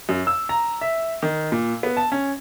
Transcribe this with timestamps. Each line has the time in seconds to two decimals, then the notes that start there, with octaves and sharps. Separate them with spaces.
0.09 F#2
0.27 E6
0.49 A#5
0.81 E5
1.22 D#3
1.52 A#2
1.83 B3
1.97 A5
2.12 C#4